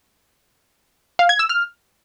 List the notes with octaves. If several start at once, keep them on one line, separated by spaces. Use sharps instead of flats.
F5
G#6
E6
F6